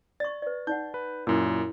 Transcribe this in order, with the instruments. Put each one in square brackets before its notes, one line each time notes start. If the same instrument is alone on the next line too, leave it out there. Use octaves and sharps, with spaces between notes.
[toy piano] D5 C#6 [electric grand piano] A6
[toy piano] B4 D5
[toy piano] D#4 D5 F#5 [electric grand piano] G6
[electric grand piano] B4
[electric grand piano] F#2 A#2 [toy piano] E4 E6